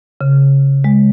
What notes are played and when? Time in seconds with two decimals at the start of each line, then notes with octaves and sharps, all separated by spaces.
0.21 C#3
0.84 G#3